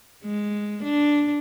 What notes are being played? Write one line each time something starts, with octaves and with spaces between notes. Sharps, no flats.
G#3
D4